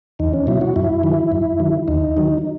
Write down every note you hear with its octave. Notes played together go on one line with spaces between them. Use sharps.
E2 D#4
C#4
B2 F#3 E4
F#4
F#2 E4
D#3 F#3
F#2
D#3 F#3
D#2 D#4
D#3 F#3